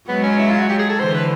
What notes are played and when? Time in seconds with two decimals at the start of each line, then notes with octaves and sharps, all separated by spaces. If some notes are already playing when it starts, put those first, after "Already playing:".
0.08 F#3 G#3 B3
0.23 C#4
0.39 E4
0.49 F4
0.59 F#4
0.70 G4
0.79 G#4
0.90 A4
0.99 D3 E3 C5
1.14 B4